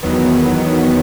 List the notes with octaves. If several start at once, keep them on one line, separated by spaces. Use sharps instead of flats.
E2 D#3 F#3 B3